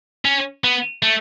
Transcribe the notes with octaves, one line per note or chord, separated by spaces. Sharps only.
C#4
B3
A3